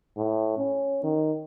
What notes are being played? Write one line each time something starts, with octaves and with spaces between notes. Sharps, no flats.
A2
C#4
D#3